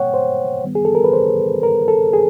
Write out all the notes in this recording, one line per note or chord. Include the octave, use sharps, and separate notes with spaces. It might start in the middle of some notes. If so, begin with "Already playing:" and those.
Already playing: B2 G3 A#3 C#5 F#5 G5
C5
D#3 G3 B3
G#4
A4
A#4
B4
C5
A#4
A4
G#4